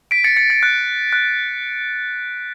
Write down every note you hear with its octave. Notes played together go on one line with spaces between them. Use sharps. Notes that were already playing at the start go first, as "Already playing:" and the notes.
B6 D7
A6 C#7
A6 C#7
A6
F#6
F#6